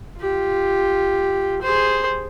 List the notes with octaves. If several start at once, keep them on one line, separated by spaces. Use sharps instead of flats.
F4 G4
G#4 C5